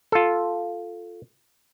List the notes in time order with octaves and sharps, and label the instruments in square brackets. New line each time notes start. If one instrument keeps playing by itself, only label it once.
[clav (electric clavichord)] F4 A4